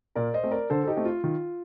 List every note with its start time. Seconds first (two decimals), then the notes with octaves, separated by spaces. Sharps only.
0.15 A#2 A#4 D5
0.34 C5 D#5
0.43 A3 C4
0.51 A#4 D5
0.70 D3 A4 C5
0.84 A4
0.87 D#4 G4
0.97 A3 C4
1.05 F4
1.24 D#3 F4